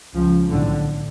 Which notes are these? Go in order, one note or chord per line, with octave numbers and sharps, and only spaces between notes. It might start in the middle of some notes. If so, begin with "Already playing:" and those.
C#2 C#3 F3
B1 A2 D3